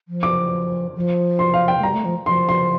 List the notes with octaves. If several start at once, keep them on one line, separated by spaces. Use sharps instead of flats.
F3
D6
F3
C6
F5
G5
A3
G3 A#5
A3
F3
F3 C6
C6